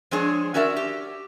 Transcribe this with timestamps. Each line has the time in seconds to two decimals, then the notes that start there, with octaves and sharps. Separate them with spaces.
0.11 F3 G#3 C4 D4 G#4 C#5
0.54 C#4 F#4 A#4 D5 E5
0.76 G4